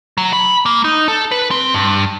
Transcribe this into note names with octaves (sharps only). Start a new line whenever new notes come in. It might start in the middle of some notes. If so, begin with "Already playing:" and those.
F#3
B5
A#3
D#4
A4
B4
C4
G2